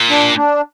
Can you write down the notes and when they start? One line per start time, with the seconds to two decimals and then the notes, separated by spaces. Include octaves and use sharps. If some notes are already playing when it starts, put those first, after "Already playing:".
Already playing: A#2
0.10 D4
0.37 D4